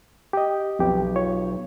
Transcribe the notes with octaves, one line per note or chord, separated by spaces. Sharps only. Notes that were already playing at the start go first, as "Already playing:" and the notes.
G4 D#5
B1 F2 G4
F4 C#5